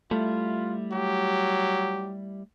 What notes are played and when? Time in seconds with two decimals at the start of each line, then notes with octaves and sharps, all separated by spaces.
0.11 G3 A3 E4 F4
0.92 F#3 G4